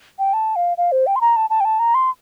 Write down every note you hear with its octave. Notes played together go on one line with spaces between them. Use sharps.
G5
A5
F5
F5
C5
G5
C6
A#5
A5
A5
G5
A5
A#5
C6